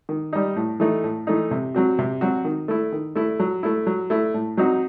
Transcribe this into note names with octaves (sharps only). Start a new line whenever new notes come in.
D#3
G3 D#4
A2
E3 A3 D#4
A2
E3 A3 D#4
C3
F#3 C4 F#4
C3
F#3 C4 F#4
D#3
A3 E4
D#3
A3 E4
F#3
A3 E4
F#3
A3 E4
A2
F#3 C4 D#4 F#4